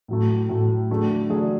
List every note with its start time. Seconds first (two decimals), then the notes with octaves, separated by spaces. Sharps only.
0.08 A2 F#3 A3
0.49 A2 F#3 A3
0.90 D3 F#3 A3 D4 G#4
1.30 D3 F#3 A3 D4 G#4